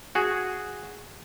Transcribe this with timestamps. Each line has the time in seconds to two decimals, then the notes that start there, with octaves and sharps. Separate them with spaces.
0.15 F#4 G#4